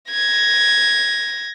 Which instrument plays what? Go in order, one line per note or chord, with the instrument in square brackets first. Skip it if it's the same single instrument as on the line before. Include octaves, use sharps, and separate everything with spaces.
[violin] G#6 A#6